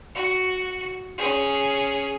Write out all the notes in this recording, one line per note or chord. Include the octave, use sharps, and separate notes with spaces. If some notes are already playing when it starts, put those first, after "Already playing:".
F#4
C#4 G#4